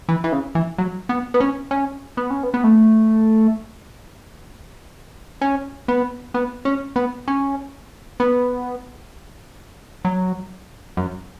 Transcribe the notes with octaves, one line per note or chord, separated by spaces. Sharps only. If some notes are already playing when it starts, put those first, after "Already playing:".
E3
E3
C#3
E3
F#3
B3
B3
C#4
C#4
B3
C#4
B3
B3
A3
C#4
B3
B3
C#4
B3
C#4
B3
F#3
F#2